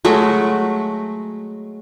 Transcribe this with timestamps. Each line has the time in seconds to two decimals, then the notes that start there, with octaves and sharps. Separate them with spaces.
0.05 F#3 G#3 A3